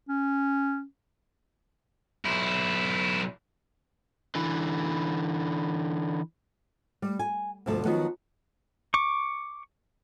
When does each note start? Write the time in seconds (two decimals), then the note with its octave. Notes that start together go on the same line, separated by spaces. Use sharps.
0.09 C#4
2.25 B1 E4
4.35 D3 E3
7.02 G3
7.19 G#5
7.66 D2 G2 B2 F3 A3 A5
7.85 D#3 F3 F#3 B3
8.94 C#6 D6